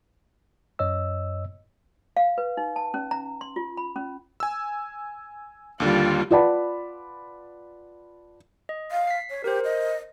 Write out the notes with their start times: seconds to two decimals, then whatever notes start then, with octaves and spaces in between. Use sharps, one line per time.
0.79 F#2 C#5 D#5 E6
2.17 F5
2.38 B4
2.57 D#4
2.76 A5
2.94 C#4
3.11 A#5
3.41 C6
3.56 F4
3.77 B5
3.96 C#4
4.40 G#5 E6
5.80 D#2 D3 G3 F4
6.31 F4 B4 D5 F#5 A5 B5
8.69 D#5
8.91 F5
9.07 B6 C7
9.30 C#5
9.44 G4 A#4 C5
9.64 D#5